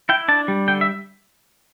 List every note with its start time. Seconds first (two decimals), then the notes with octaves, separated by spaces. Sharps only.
0.09 E4 G5
0.28 D4 A5
0.48 G3
0.68 D3 G5
0.81 E5